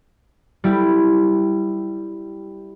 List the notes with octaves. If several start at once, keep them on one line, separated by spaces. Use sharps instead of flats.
G3 E4 G4